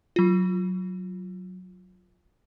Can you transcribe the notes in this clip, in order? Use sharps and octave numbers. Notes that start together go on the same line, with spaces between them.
F#3 F4